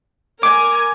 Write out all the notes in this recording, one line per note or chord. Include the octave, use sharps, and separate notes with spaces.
A#4 G#5 D6